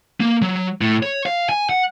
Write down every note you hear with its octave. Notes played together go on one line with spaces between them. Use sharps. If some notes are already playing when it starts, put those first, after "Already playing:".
A#3
F#3
A2
C#5
F5
G#5
F#5